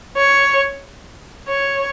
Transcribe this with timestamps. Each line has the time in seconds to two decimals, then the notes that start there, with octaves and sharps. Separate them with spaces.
0.17 C#5
1.48 C#5